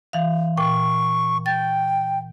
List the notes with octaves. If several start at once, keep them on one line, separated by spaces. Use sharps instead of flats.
E3 F5
A#2 G5 C#6
G5 A6